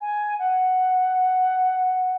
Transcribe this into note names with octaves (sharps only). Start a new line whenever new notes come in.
G#5
F#5